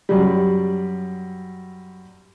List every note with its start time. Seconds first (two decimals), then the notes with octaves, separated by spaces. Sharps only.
0.09 F#2 G3